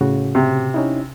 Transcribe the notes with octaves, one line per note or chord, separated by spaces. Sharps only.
A2 C#3 F#4
C3
C#4 D#4 E4